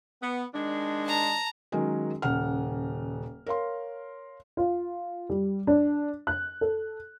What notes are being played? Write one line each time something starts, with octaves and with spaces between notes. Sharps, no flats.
B3
D#3 G#3 D4
A5 A#5
D#3 F#3 G#3 C#4 G#4 A#4
D#1 C#3 F#5 F6
A#4 C#5 F5 C6
F4
G3
D4
F#6
A4